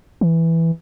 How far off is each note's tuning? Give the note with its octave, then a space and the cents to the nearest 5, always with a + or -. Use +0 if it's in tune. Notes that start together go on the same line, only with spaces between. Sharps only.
E3 +0